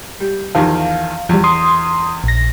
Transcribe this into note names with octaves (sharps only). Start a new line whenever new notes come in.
G3
E2 D#3 F3 F5
E2 F3 G3
C6 D#6
A#1 A#6